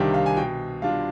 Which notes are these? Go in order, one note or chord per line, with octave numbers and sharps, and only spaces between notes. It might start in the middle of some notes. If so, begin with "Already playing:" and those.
Already playing: C2 C3 D#3 G3 D4 F5 G5
F5
G#5
B2 G5
G3 D4 F4 F5